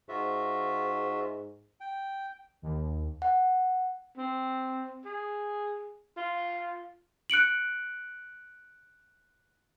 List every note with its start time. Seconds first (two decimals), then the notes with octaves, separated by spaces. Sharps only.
0.09 G#2 F4 F#4 E5
1.81 G5
2.62 D#2
3.22 F#5
4.17 C4
5.05 G#4
6.17 F4
7.30 F#6 C#7 D7 F#7